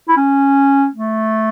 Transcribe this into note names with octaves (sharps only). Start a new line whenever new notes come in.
E4
C#4
A3